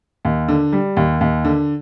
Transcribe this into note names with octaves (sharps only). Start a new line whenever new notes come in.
D#2
D3
G3
D#2
D#2
D3